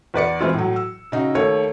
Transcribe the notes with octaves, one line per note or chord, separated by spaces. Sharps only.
E2 B4 D5 C#7
E3 G#3 C4 E4 F4
A2 F#3
E6
C#3 D#4 F#4
D#2 A3 C#5